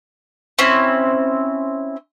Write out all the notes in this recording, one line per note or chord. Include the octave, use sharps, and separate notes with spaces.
C4 C#4 E4